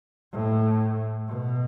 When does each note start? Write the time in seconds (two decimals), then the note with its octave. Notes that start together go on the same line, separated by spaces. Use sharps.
0.33 A2
1.27 B2